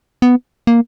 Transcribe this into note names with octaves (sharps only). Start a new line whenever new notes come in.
B3
A#3